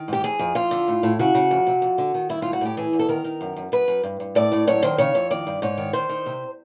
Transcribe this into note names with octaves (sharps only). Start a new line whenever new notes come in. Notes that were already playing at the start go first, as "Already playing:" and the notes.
Already playing: D#3
G#2 G4
F2 G#4
F2
F2 F4
D3
A2
A2
C#3 F#4
C#3
F2
C3
F2
D3
D#3
G2 E4
A2 F4
F#4
A2 G4
E3 G#4
E2
A4
D#3 A#4
D#3
F#2
F#2
F#2 B4
F#2
G2
G2
A2 D5
A2
F#2 C#5
D#3 C5
C#3 C#5
F2
D#3 D5
G2
G#2 C#5
D#3
D#3 C5
D#3
C3